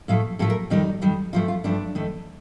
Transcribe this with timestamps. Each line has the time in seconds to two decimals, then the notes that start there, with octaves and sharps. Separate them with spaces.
0.08 A2 F3 A3 F5
0.39 A2 F3 A3 A4
0.50 A#4
0.70 F2 D#3 G3 D#4
1.02 F2 D#3 G3
1.33 G2 F3 A3 F4
1.48 F4
1.64 G2 F3 A3 D4
1.95 F2 D#3 A3